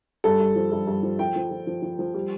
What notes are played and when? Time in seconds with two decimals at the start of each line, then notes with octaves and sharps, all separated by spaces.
0.24 G2 A4
0.40 G2
0.56 F3
0.72 G2
0.87 G2
1.03 F3
1.19 F3 G5
1.36 F3
1.51 F3
1.67 F3
1.82 F3
1.99 F3
2.14 G3